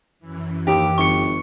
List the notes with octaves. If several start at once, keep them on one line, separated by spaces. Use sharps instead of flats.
F#2 E3
D#2 G4
G1 C#6 C#7